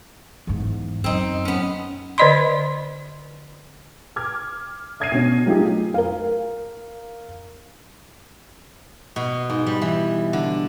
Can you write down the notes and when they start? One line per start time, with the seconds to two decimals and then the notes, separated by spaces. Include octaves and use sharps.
0.47 E2 G#2
1.04 F#2 C4 D#4
1.45 B3 C#4
2.18 D3 C5 D5 D#5 B5 C6
4.16 D6 F6 G#6
5.00 E5 D#6 G#6 A#6 C7 D#7
5.12 B2 C#4
5.46 F#3 A3 D#4 F4 G4 G#4
5.94 A#4 F5
9.16 B2
9.50 G#2
9.66 G3
9.82 E3
10.33 D3